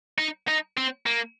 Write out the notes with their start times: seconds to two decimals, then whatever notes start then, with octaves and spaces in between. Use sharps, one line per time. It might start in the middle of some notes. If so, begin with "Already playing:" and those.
0.18 D#4
0.48 D#4
0.77 C4
1.06 A#3